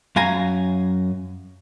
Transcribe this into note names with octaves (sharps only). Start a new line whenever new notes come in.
F#2 F5 G#5 A#5